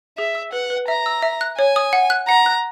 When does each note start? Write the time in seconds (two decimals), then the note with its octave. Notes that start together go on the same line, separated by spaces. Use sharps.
0.18 G#4 E5
0.35 E6
0.53 B4 F#5
0.70 B4
0.88 E5 A#5
1.06 E6
1.22 E5
1.41 F#6
1.58 C#5 G#5
1.76 D#6
1.93 F#5
2.10 F#6
2.28 F#5 A#5
2.46 F#6